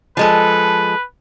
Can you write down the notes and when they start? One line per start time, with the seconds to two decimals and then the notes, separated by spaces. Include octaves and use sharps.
0.17 F3 G#3 A4 B4